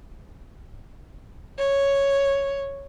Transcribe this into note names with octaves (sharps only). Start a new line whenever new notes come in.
C#5